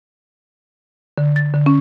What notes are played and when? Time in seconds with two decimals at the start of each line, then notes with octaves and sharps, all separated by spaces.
1.18 D3
1.36 A6
1.54 D3
1.66 C#4